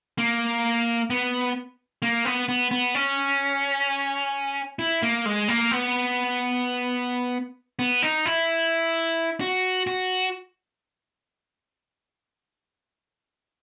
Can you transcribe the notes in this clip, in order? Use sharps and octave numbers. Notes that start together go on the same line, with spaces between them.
A#3
B3
A#3
B3
B3
B3
C#4
E4
A#3
G#3
A#3
B3
B3
D#4
E4
F#4
F#4